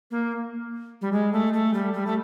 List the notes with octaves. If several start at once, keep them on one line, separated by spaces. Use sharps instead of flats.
A#3
G3
G#3
A3
A3
G3
G3
A3